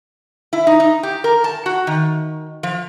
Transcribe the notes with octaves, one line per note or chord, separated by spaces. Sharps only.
E4
D#4
D#4
G4
A#4
A5
F#4
D#3
F3